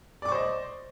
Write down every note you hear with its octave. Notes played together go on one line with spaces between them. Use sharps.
C5 D5 D#5 C#6 D6